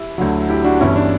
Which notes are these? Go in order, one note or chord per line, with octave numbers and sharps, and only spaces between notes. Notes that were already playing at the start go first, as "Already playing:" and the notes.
Already playing: E4 G4
D2 D3 F#3
E4 G4
D4 F#4
G1 G2 E3 C#4 E4
D4